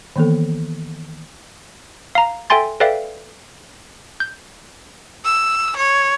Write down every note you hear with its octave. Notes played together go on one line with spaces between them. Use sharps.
D#3 E3 A#3 B3 A4
F5 A#5
A4 E5 G5 G#5 C6 A6
A4 B4 D5 E5 F5 G5
G6
E6
C#5